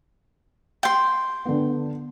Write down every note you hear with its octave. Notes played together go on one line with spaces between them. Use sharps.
G5 C6
D3 B3